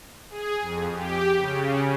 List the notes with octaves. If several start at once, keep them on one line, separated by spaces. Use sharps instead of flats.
G#4
F2
G4
C#3